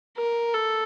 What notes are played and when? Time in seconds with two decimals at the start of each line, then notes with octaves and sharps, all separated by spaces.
0.17 A#4
0.54 A4